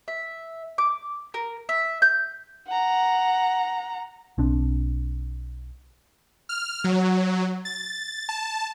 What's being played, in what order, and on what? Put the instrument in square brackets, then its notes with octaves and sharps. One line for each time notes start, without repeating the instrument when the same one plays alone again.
[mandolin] E5
D6
A#4
E5
G6
[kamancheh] F#5 A#5
[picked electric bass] B1 C4 D4
[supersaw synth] F6
F#3
A6
A5